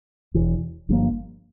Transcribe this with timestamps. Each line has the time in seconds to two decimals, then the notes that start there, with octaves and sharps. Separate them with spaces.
0.34 E1 E2 E3
0.89 G1 G2 F3 A#3